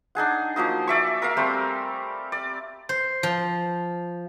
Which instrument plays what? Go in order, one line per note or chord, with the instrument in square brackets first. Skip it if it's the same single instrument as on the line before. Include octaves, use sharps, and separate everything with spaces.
[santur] D4 D#4 G#4 F#5
F3 F#3 A#3 D#5
D5 E5 C#6
A#4 E5 F5
G3 A3 C4 A#4
D5
[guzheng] C5
F3